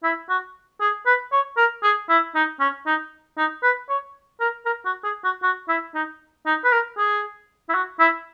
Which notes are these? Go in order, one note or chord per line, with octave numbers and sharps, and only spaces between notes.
E4
F#4
G#4
B4
C#5
A#4
G#4
E4
D#4
C#4
D#4
D#4
B4
C#5
A#4
A#4
F#4
G#4
F#4
F#4
E4
D#4
D#4
B4
A#4
G#4
E4
F#4
E4